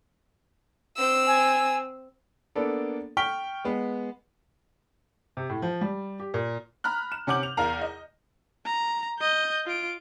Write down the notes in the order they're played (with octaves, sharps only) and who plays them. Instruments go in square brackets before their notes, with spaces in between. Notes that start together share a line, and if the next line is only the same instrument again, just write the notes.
[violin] C4 E6
[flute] G#5
[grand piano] A#3 B3 D4 A4
G5 C#6 F6 B6 G7
G#3 B3
[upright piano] C3
A2
F3
G3
G4
A#2
[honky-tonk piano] A#5 B5 F6 F#6
E7
C3 C#4 F#5 D6 G6 F#7
F7
E2 A#4 F5 A#5
D#5
[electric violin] A#5
D#5 G6
F4 D7